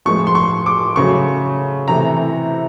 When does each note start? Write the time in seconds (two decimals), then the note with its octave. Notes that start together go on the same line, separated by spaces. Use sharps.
0.05 A2 F3 G#3 C#6
0.27 C6
0.35 C#6
0.66 D6
0.96 C#3 F#3 A3 C#6
1.88 C3 E3 A3 A#5